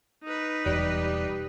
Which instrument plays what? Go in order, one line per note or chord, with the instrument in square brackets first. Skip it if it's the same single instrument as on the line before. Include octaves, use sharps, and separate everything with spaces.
[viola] D#4 B4
[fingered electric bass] E1 [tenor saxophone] G3